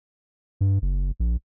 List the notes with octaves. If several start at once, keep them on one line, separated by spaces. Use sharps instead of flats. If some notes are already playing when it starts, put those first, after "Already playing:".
G2
F#1
A#1